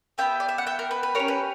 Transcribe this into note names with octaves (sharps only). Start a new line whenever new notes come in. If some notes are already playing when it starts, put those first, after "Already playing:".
B3 E4 G4 E5 G5
D5
E5
F#5
E5 G5
A#4
B4
B4
C#4 G4 A#4 C#5
B4